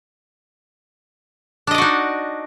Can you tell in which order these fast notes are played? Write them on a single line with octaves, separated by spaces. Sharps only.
D4 D#5 D5 F#4 D#4